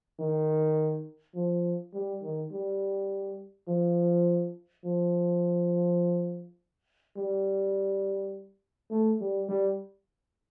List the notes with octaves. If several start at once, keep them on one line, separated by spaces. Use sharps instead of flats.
D#3
F3
G3
D#3
G3
F3
F3
G3
A3
G3
G3